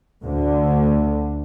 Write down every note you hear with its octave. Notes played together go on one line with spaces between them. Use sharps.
D2 D3